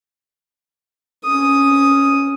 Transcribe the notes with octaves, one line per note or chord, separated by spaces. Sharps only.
C#4 D#6